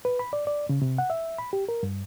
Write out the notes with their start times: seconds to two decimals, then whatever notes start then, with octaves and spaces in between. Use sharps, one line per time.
0.05 B4
0.19 B5
0.33 D5
0.47 D5
0.69 C#3
0.82 C3
0.98 F#5
1.10 E5
1.38 B5
1.53 G4
1.69 A#4
1.83 G2